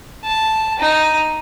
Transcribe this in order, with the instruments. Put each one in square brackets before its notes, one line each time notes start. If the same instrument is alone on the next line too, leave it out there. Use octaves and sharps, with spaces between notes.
[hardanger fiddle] A5
D#4